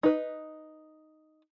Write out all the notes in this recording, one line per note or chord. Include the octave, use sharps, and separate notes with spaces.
D#4 B4